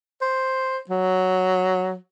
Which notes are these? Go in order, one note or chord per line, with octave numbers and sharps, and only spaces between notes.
C5
F#3